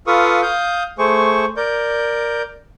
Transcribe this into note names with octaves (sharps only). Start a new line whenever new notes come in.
F4 A4 B4 F5 C#6 D#6
F5 D#6 G6
A3 G#4 C5 C#6
A#4 D5 G6